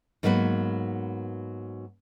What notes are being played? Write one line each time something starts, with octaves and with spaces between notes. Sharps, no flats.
G#2 F#3 A#3 B3 F4 B4